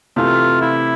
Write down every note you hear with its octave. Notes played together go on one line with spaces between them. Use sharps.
C3 E3 A3 F4
E4